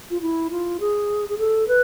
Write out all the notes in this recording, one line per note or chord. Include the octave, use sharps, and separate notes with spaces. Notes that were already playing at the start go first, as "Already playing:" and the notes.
F4
E4
F4
G#4
G#4
A4
B4